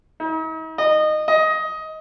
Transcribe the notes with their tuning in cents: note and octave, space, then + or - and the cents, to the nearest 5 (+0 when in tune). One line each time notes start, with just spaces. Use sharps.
D#4 +45
D#5 -20
D#5 +15